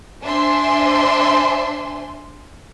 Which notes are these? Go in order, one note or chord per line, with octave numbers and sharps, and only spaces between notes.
D4 C5 E5 G#5 C6